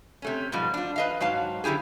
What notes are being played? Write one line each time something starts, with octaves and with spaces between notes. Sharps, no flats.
C3 A3 C#4
G#2 B2 F3 G3
D4 F4
B4 D#5 F5
G#2 F#3 F5 A5
F#2 D3 E4 G4 G#4